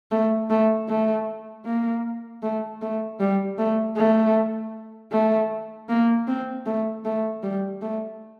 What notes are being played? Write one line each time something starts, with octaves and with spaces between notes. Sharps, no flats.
A3
A3
A3
A#3
A3
A3
G3
A3
A3
A3
A#3
C4
A3
A3
G3
A3